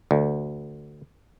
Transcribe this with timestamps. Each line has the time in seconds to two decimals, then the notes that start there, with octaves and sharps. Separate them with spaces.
0.11 D2